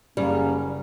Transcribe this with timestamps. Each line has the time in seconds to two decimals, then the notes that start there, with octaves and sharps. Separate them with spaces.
0.17 F#1 C#3 G3 A#3 C#4